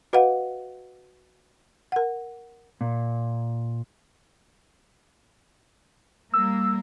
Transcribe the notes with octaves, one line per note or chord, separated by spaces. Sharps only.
F#4 B4 D#5 F5 F#5
A#4 F#5
A#2
G3 A#3 E6